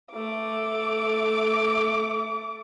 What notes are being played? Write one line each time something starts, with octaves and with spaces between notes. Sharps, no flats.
A3 D6